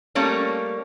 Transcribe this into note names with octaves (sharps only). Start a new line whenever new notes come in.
G3 A3 A#3 C#4 C#5